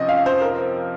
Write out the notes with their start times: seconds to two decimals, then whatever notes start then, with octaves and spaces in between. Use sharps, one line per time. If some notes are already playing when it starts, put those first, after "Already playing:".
Already playing: C3 F3 C4 C#4 D#5
0.09 F5
0.26 C5
0.42 A#4